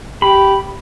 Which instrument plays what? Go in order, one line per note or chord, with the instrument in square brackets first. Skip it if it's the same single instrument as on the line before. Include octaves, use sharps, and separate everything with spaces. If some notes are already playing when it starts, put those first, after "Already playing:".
[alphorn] G4 [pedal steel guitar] B5